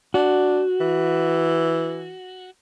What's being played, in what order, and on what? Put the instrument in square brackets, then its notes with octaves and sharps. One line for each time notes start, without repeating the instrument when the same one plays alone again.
[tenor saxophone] D4 [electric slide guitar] F#4
[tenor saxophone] E3